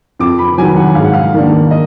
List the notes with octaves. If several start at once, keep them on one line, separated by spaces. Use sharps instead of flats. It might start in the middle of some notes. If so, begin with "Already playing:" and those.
F2 D6
B5
D#3 F#3 G#5
F#5
G#2 F5
F#5
F5
D#3 A#3 D4
D#5